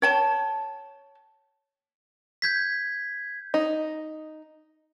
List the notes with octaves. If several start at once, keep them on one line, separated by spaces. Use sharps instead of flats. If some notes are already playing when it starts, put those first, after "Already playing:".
C#5 G5 A5
G6 G#6 B6
D#4